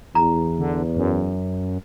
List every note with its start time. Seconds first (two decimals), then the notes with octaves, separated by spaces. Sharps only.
0.15 E2 A#5
0.59 D3
0.97 F#2